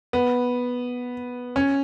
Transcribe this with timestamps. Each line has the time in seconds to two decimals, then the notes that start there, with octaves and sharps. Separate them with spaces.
0.13 B3
1.56 C#4